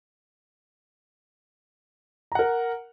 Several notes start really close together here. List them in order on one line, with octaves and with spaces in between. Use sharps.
A#5 F#5 A#4